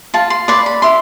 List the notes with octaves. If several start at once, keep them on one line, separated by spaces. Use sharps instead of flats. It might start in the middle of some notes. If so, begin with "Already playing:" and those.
F4 A5
C6
B4 D5 C6
B5
E4 C6